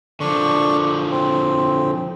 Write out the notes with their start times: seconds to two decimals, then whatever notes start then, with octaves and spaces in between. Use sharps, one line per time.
0.20 D3 F3 D4 C#6
1.11 C4